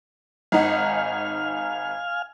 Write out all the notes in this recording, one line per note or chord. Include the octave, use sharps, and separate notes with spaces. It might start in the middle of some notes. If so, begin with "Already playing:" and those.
G#1 D#4 F5 F#5 G#5 F6